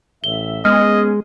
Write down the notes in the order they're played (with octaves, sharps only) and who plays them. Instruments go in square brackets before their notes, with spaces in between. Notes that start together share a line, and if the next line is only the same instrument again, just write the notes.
[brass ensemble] A1 E5 [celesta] G7
[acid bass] G#3 [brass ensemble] B3 C#4 G#4 [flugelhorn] D#5 [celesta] F6